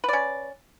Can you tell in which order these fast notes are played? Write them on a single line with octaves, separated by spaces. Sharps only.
B4 D5 C#4